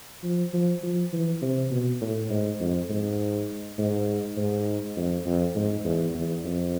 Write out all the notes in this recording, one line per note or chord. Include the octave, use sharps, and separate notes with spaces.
F3
F3
F3
E3
C3
B2
A2
G#2
F2
G#2
G#2
G#2
F2
F2
G#2
E2
E2
F2